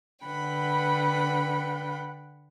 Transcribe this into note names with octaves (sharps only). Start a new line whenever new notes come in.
D3 B4 F#5 G5 B5